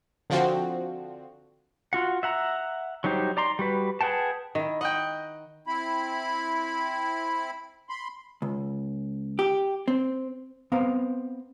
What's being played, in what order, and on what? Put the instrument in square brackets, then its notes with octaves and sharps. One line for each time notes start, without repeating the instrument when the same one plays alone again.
[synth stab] D3 F3 C4 F#4
[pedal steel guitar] F4 F#4 F#5
E5 F#5 A#5
F#3 G3 D#4 G4 C5
D5 A#5 C6
G3 F#4 B4
G#4 B4 F#5 G5 A5
[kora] D#3 E4
[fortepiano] D#5 G5 [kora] F#5
[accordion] C4 E4 B5
B5 C6
[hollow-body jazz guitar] C#2
G4
C4
B3 C4 F5 A#5